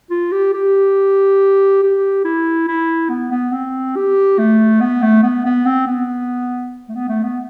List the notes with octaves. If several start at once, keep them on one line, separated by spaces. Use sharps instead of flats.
F4
G4
G4
G4
E4
E4
B3
B3
C4
G4
A3
B3
A3
B3
B3
C4
B3
A3
B3
A3
B3